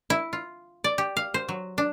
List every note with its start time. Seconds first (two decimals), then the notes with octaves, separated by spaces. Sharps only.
0.10 E4
0.33 F4
0.84 D5
0.98 G4
1.17 F5
1.34 C5
1.49 F#3
1.78 D4